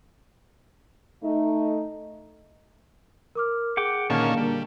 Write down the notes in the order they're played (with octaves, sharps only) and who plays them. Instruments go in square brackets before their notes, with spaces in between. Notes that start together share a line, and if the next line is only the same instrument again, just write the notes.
[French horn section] A3 D#4
[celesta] A#4 D6 F6
[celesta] G#4 [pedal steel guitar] F#5 G5 D6
[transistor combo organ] A#2 D#3 C#4 [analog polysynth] D3 A#3 [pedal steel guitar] A5
[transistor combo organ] G3